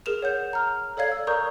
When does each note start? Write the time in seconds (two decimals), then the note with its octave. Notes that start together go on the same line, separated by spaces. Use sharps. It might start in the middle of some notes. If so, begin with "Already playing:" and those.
0.06 G#4 A#4 E7 F7
0.22 C#5 F#5 G6
0.53 A#5 F6
0.97 A4 C#5 D5 F5 G#6
1.12 E6
1.27 A#4 D5 A#5 C#6 D#6 G6